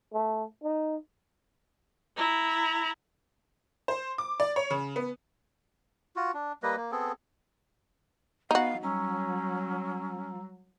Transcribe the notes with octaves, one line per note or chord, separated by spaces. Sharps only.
A3
D#4
E4 A#5
C5
D6
D5
C#5
C#3
B3
F4 F#4
D4
G3 A#3 B4 D#5
A#3
B3 C4 G#4 A4
B3 D#4 F#4 F5
F#3 G3 C#4 A#5 E6